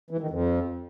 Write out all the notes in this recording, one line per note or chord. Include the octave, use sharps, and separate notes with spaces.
E3
D#3
F2